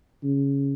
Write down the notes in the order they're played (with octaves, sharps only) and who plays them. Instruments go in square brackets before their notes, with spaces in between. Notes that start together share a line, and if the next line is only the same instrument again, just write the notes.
[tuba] C#3